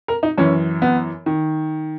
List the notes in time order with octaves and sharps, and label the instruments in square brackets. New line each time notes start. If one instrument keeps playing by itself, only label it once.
[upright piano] A#4
D#4
F#2 E3 C#4
B3
D#3